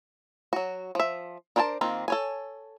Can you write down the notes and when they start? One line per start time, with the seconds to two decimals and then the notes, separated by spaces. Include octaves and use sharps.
0.53 F#3 F#4
0.95 F3 E5
1.56 D4 A#4 C5 G#5 A5
1.81 D#3 A#3 C4 F4
2.08 A4 C#5 G#5